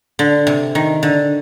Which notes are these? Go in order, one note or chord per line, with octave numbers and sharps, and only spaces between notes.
D3
C3
D#3
D3